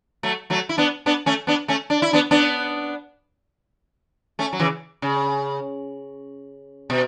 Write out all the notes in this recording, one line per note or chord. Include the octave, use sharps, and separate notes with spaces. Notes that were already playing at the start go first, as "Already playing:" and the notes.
F#3 A3
F#3 A3
E4
B3 D4
B3 D4
A3 C#4
B3 D4
A3 C#4
D4
E4
B3 D4
B3 D4
A3 C#4
F#3
C#3 E3
C#3
B2